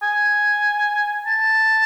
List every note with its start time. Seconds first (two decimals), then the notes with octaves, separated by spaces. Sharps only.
0.03 G#5
1.27 A5